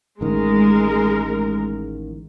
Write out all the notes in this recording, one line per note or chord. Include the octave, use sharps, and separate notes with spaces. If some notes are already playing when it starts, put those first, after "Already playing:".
A1 D#3 G#3 A#4